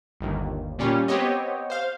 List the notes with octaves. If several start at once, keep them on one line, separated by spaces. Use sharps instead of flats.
G1 D#2
A#2 G3 C#4 F4
B3 C4 G4 C#5 D#5
C5 F5